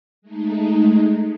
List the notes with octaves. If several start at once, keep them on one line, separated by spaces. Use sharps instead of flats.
G#3 A3 D#4